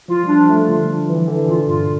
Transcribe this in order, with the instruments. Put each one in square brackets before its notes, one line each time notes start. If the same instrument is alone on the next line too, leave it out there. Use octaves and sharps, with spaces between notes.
[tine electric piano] F3 [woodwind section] F4
[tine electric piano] G3
[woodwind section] D4
[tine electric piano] F3
[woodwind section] A3
[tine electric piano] D3 [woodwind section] F4
[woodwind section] D4
E3
[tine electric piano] D3 [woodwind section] E3
[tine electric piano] A#2 [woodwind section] F4
[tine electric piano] G2 [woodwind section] F4